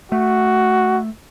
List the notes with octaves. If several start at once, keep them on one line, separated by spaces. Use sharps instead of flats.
A3 F#4